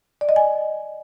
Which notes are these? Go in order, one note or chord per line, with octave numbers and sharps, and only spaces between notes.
D5
D#5
G#5